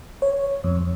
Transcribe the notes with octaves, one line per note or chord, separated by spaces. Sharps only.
C#5
F2